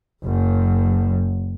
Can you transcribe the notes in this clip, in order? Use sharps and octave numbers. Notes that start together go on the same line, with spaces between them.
F#1 F#2